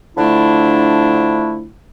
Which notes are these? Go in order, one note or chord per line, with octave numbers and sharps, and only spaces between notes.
D3 F3 A3 D4 E4